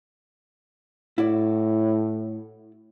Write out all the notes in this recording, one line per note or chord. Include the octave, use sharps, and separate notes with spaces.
A2 E4 F#4 D5